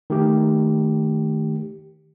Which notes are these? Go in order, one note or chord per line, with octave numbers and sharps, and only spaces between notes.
D#3 A3 G4